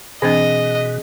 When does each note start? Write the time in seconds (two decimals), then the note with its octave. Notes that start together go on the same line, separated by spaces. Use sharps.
0.22 B2 E3 C4 D4 G#4 D#5